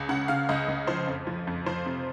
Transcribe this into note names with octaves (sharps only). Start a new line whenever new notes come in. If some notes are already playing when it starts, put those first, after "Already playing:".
Already playing: C#2
C#3 F#5
C#3 F5
C#2 D#5
C#2
F3 C5
F2
F3
F2
F3 C5
C3